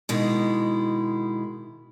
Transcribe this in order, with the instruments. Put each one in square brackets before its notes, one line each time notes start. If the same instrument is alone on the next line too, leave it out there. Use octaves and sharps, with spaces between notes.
[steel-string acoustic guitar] B2 D#3 G#3 E4